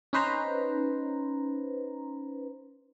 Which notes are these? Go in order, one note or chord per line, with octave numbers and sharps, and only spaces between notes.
C#4 D#4 B4 C5 A#5